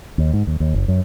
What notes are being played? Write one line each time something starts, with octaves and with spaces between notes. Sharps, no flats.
D#2
G#2
D#2
D#2
F#1
F#2